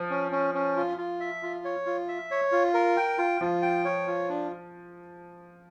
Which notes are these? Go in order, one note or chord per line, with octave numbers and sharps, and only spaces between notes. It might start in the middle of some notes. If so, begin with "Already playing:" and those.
Already playing: F3
C#4
C#4
C#4
F4
F4
E5
F4
C#5
F4
E5
C#5
F4
A#4
G5
F4
F3 F4
G5
C#5
F4
D4